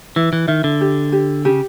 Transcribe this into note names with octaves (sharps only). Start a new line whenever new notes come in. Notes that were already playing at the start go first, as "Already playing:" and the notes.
E3 E4
E3
D#3 E5
D3
G4
G4
C#3 G4